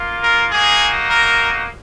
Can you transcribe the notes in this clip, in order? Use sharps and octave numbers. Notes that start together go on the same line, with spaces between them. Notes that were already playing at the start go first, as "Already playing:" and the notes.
Already playing: A#3 F4
A#4
A#3 D#4 F#4 G#4
A#4